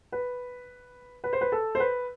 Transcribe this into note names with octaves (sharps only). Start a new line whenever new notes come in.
B4
B4
C5
B4
A4
C5
B4